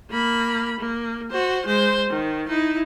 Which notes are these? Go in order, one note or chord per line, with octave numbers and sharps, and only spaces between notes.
A#3 B5
A#3
F#4 C5
G#3 C5
D#3
D#4 E4